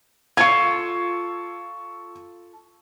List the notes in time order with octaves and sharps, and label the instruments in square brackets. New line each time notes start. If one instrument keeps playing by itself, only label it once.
[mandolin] F4 A4 [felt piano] C#6 G#6